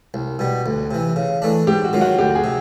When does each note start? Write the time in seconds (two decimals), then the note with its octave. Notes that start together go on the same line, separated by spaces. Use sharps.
0.14 C2
0.39 B2 G3
0.66 D2
0.91 C3 E3
1.16 C#3
1.42 E3 A3 D4
1.67 G#2 G4
1.84 F#4
1.93 D#3 F#3 F4
2.01 F#4
2.19 D2 G4
2.35 G#4
2.44 C3